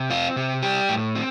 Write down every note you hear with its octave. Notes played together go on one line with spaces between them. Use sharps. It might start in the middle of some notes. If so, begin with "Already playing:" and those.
Already playing: C3
C4 F4
C3
G3 G4
A2
C4